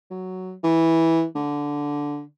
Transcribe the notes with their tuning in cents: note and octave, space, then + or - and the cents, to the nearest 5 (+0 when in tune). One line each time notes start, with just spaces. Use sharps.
F#3 +5
E3 -10
D3 -10